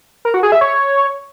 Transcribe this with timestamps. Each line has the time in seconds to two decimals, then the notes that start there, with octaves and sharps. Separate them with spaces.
0.25 A#4
0.34 F#4
0.43 G#4
0.52 E5
0.61 C#5